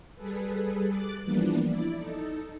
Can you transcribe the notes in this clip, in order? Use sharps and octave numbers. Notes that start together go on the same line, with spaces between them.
G3 G#4 A4 B4
D6 F#6 A6
E3 F3 G3 A#3 B3 D4
E4 D5
D#4 A4